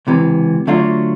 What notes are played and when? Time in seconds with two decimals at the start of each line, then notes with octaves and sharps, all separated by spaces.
0.07 C#2 C3 E3
0.67 D3 F#3 A3 D4 F4